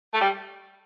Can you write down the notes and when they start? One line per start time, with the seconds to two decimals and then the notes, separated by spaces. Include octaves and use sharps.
0.14 A3
0.21 G3